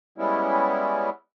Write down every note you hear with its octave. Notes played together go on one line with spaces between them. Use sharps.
G3 G#3 B3 C#4 E4